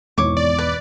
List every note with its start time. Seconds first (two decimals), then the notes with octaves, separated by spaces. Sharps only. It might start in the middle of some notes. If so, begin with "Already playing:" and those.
0.18 G#1 E2 B2 E3 C#5 D6
0.37 D5
0.58 B4